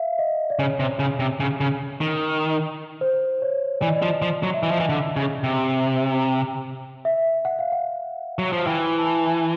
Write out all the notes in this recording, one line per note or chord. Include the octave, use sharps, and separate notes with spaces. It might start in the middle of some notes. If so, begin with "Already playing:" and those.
Already playing: E5 F5
D#5
D5
C#3 C#5
C3
C#3
C3
C#3
C#3
D#3
C5
C#5
E3 D5
D#5
D5
F3
F3
F#3
E5
E3 D#5
F3
E3
D3
C#3
C3
E5
F#5
F5
F#5
F#3
F3
E3 G5
A5
G#5